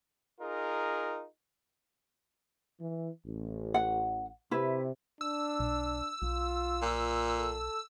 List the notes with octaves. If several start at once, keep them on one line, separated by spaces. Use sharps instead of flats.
D#4 F4 G#4 A#4
E3
A1
F#5
C3 E4 B4
D4 E6
B1
B1 F4
A#2
A4